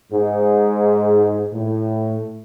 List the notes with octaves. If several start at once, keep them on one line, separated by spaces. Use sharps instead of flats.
G#2
A2